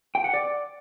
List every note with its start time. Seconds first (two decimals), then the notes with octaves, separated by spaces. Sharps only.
0.15 G5
0.24 F#5
0.34 D5